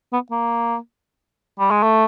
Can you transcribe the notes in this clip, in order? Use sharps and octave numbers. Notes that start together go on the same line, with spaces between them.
B3
A#3
G3
G#3
A3